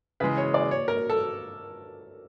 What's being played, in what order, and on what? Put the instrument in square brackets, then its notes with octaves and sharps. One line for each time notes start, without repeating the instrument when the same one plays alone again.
[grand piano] C#3 E3 G#3 [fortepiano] B4
[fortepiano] C#5
D5
C#5
A#4
A4